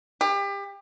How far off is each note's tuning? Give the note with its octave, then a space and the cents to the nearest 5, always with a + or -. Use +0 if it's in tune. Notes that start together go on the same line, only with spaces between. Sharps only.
G4 +30